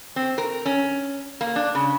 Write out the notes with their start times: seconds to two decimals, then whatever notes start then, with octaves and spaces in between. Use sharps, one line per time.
0.16 C4
0.38 A#4
0.66 C#4
1.41 A#3
1.56 D4
1.75 C#3